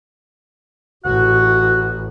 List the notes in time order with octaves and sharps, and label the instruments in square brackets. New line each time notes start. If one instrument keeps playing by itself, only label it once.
[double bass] A1 [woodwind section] F#4 [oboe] F#5